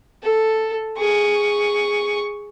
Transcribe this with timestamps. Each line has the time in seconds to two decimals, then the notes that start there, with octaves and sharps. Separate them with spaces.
0.23 A4
0.98 G#4 C#6